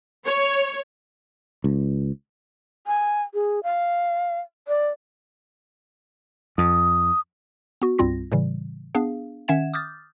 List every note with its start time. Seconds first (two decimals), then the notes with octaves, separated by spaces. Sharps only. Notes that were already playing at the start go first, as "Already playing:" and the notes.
0.25 C#5
1.64 C#2
2.87 G#5
3.34 G#4
3.63 F5
4.68 D5
6.58 F2 D#6
7.82 B3 F#4
7.99 C2 G2 G3 C4 F4 A#6
8.32 A2 C#3 E3 G3
8.95 B3 D4 G#4 F5
9.48 D#3 C#4 E5 F#5 G#6 E7
9.74 D6 D#6 F6 G6 A6